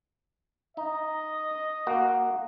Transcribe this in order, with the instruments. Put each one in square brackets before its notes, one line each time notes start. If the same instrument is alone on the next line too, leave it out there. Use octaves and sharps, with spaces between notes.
[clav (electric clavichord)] D#4 [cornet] D#5
[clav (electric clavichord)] A#3 F#4